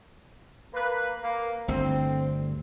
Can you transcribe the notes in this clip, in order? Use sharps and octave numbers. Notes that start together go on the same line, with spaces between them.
A#3 B4
A#3
G1 D2 C4